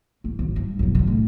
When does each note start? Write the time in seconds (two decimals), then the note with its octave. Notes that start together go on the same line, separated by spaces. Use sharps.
0.24 A#3
0.39 G#1
0.56 G2
0.79 F#2 B2
0.95 D3 F#3
1.07 A2